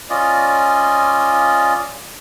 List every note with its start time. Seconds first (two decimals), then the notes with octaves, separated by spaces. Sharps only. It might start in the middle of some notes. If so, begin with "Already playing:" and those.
0.10 C#4 F4 D5 D#5